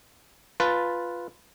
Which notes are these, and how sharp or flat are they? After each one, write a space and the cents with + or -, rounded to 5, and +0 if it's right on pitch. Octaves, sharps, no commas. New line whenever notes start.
F4 +0 B4 +0 A5 +0